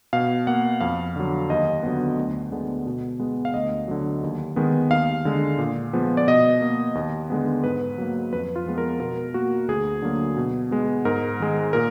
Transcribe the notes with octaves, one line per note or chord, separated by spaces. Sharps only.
B2 F5
A#3 F#5
F2 F5
D3 F#3
D#2 D#5
D3 F#3 B3
D2
D3 G#3 B3
B2
G#3 B3
F5
D2 D#5
D3 F#3
D#2
D#3 G#3 B3
D#2 F5
D3 G#3
A#2
F3 G#3 B3
D5
B2 D#5
A#3
D#2
D3 G#3 B3
G#2 B4
F#3 A#3
F2 B4
F4
F3 G#3 B3
A#4
B2 A#4
A#3 F#4
D2 G#4
D3 F#3 A#3
B2
G#3 B3
G#2 A#4
D#3 G#3
A#2 A#4